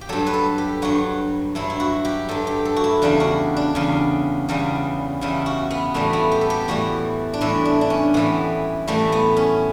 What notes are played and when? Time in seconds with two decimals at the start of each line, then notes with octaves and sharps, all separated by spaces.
0.01 G4
0.09 G2 F#3 A4
0.26 B4
0.34 A4
0.58 G4
0.82 G2 F#3 F#4
1.55 G2 F#3 E4
1.70 E4
1.80 F#4
2.05 G4
2.29 G2 F#3 A4
2.47 G4
2.65 A4
2.76 F#4
2.84 E4
3.02 E2 C#3 G3 D4
3.20 F#4
3.56 D4
3.75 E2 C#3 G3
4.49 E2 C#3 G3
5.21 E2 C#3 G3 E4
5.46 F#4
5.71 B3
5.94 A2 E3 G3 A3
6.13 B3
6.31 G4
6.41 A4
6.50 G4
6.68 A2 E3 G3 F#4
7.33 D4
7.41 A2 E3 G3 E4
7.65 D4
7.81 D4
7.90 C#4
8.14 A2 E3 G3 B3
8.87 A2 E3 G3 A3
9.12 B3
9.36 C#4